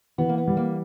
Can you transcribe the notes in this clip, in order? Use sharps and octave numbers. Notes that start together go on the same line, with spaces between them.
E3 B3
A#3
B3
G3
A#3